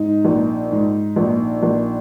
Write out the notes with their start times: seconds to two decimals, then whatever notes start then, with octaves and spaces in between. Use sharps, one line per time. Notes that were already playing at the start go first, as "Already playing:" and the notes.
Already playing: G#2 D#4
0.25 A#1
0.71 G#2
1.16 A#1
1.63 A#1